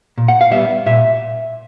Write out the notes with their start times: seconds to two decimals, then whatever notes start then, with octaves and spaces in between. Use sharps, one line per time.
0.18 A#2
0.28 F#5
0.41 F5
0.51 G3 B3 E5
0.86 A#2 E5